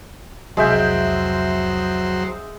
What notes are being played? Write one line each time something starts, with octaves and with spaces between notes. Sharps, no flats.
C2 F2 F#3 G#3 C5 E5 G5